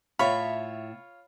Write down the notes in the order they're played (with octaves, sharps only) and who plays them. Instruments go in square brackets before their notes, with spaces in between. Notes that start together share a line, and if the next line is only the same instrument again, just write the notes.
[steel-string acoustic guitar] A2 E5 [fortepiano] F4 C#5 [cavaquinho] B5